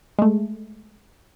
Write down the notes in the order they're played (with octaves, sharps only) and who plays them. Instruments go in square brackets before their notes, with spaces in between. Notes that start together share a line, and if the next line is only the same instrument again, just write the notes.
[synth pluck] G#3 A3